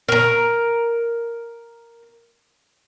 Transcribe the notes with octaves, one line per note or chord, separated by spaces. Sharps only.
A#4 A#5